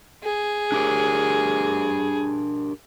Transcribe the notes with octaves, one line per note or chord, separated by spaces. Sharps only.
G#4
D4 G4 A#4